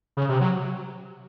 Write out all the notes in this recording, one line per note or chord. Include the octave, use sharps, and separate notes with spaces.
C#3
C3
F#3